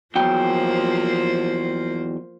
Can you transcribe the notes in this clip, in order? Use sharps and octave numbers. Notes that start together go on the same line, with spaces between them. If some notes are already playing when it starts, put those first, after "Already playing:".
E2 F3 F#3 A#3 C5 G5